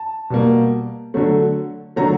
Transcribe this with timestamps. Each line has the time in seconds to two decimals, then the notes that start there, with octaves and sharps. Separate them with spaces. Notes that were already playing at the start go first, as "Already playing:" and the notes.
Already playing: A5
0.30 B2 G3 A#3
1.14 D3 F#3 A3
1.96 D3 F#3 A3 A#5